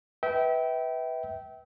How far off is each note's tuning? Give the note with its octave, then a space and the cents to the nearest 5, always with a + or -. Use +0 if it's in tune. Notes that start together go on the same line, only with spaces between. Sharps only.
B4 +0 E5 -30 G5 -20